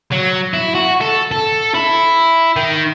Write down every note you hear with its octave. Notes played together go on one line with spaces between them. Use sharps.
F#3
E4
F#4
A4
A4
E4
D#3